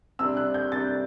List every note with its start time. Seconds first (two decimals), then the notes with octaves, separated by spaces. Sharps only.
0.19 C3 G3 D4 E6
0.37 F#6
0.54 G6
0.72 C3 G3 D4 A6